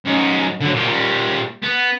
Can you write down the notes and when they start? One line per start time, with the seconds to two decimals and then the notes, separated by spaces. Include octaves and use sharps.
0.05 F#2 D#4
0.61 D3 F#3
0.74 A#2 G4
0.86 A#2 G3
1.63 B3